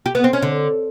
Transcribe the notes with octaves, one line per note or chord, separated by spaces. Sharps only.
G4
B3
C4
C#4
D3